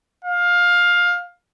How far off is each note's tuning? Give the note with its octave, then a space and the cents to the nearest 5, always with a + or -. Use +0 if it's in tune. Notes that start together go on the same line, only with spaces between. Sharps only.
F5 +15